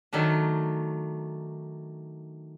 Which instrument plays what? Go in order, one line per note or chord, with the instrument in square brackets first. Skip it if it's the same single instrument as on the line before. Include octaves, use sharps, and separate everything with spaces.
[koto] D#3 F#3 A3 D4